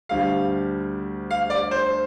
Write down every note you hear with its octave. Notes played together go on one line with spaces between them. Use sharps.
D2 D3 G3 F5
F5
D5
C5